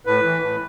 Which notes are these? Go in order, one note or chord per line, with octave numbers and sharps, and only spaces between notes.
A2 B4
E3
A2